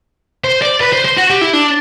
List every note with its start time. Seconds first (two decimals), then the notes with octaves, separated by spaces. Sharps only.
0.44 C5
0.62 D5
0.81 B4
0.93 C5
1.05 C5
1.17 F#4
1.30 G4
1.41 E4
1.53 D4